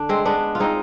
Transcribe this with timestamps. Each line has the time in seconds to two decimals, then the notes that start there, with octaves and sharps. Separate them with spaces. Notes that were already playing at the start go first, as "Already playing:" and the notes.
Already playing: D3 D4
0.09 G#3 C4
0.26 G#3 B3 D4
0.55 F4
0.60 G#3 C4 D#4